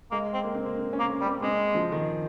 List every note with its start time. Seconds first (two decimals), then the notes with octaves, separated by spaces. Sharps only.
0.11 G#3 A#3
0.33 C4
0.44 A#3
0.55 C4
0.66 A#3
0.77 C4
0.93 C#4
0.99 A#3
1.09 A#3
1.21 G3
1.27 C4
1.42 G#3 C4
1.75 F3
1.92 D#3